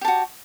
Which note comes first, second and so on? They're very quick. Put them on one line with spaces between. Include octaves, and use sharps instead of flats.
G4 A5 F#4